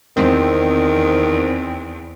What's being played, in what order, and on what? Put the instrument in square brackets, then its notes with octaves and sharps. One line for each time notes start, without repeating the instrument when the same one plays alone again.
[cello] E2 [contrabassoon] D#3 [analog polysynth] C4